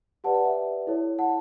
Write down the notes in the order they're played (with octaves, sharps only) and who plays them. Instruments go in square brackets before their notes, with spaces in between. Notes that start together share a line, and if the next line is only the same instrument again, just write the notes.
[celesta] G4 B4 D5 F#5 A5
F#5
E5
E4 A4 C#5
F#5 A5